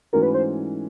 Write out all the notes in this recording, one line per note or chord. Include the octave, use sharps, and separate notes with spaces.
G#2 E3 A3 C#4 F#4 A#4
B4
C5